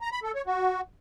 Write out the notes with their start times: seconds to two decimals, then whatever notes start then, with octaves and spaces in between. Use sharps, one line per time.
0.01 A#5
0.12 B5
0.23 A4
0.35 C#5
0.46 F#4